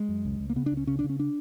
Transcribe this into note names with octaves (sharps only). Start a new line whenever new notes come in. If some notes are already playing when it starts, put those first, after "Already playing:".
Already playing: G#3
F#2
C#2
C#2
A#3
C#3 B3
D4
C#2
C#4
C#3 C#4
D4
C#3
C#4
D4